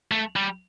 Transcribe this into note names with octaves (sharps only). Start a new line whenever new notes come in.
A3
G3